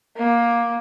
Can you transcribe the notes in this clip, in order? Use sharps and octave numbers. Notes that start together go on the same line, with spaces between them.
A#3